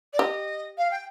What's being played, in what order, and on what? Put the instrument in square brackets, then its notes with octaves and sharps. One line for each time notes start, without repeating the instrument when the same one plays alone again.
[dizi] D5
[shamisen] G4 [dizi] D#5
[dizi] F5
G5